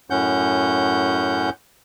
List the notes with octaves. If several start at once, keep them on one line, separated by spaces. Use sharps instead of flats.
F#2 A2 C#4 F#5 G6